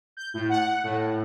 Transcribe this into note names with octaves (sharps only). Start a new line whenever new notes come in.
G6
A2
F#5
A2